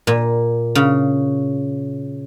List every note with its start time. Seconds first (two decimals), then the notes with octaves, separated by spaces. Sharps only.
0.07 A#2
0.75 C#3